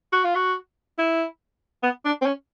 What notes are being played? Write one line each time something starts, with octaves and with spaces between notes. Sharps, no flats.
F#4
F4
F#4
E4
B3
D4
C4
C#4